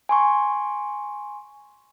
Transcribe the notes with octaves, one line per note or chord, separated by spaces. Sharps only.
G#5 C6 C#6